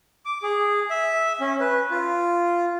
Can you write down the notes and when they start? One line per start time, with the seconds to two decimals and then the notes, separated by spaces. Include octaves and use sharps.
0.25 D6
0.43 G#4
0.90 E5
1.40 C#4
1.60 B4
1.91 F4